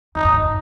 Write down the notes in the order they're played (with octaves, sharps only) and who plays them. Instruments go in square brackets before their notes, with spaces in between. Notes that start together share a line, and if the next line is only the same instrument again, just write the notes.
[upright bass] E2 [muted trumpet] D#4
[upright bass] F2
F#2